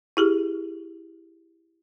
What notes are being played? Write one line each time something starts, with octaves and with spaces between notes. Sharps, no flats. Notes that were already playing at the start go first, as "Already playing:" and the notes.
E4 G4 G#4